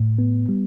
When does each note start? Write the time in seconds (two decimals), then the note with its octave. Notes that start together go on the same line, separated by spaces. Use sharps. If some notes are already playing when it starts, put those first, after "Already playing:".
Already playing: A2
0.19 B3
0.49 G3